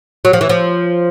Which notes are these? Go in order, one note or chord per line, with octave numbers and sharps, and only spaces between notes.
F#3
F3
E3
F3